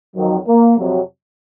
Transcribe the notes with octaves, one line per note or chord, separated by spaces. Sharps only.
F2 D#3 F#3
A#3
F2 C3 F#3